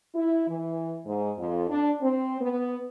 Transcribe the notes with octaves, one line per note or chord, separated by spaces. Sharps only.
E4
E3
G#2
F2
D4
C4
B3